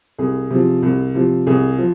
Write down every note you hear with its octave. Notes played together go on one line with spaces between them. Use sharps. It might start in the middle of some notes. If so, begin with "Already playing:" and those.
C2 G#4
C3 F3
C2
C3 F3
C2 G#4
F3